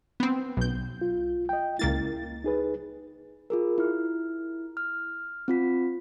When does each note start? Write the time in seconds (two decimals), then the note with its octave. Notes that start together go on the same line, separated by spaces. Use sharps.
0.20 B3 C4
0.57 B1 G6
1.01 F4
1.49 D#5 G5
1.79 C#2 A#3 E4 A6
2.44 D#4 G#4 B4
3.50 F4 G#4 A#4
3.78 E4 F6
4.77 F6
5.48 C4 F4 B6